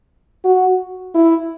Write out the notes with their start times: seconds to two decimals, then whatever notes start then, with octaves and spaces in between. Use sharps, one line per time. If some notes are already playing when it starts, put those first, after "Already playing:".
0.45 F#4
1.15 E4